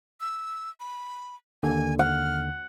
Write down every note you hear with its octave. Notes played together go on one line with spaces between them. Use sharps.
E6
B5
D#2 D3 G#5
F#5 F6